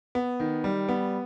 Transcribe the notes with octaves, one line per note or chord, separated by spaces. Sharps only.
B3
D#3
G3
B3